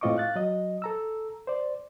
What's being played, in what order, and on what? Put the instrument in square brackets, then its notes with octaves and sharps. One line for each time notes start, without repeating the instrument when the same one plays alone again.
[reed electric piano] A2 C4 F4 D#5 C#6 D6
F5 F#6 A6
F#3 D#5
A4 A#5 E6
C5 D5